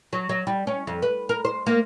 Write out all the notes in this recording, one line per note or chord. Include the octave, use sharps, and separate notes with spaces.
F#3
F#3
G3
C#4
F2
B4
A#4
C5
A#3